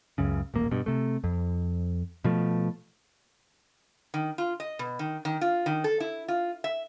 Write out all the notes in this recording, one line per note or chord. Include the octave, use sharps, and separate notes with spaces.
C#2 F#2 C#3
D#1 A1 A#3
G2 B2
C3 A3
F2
B2 F3 A3
D#3
F4
D#5
B2
D#3
D#3
F4
D#3
A4
E4
F4
E5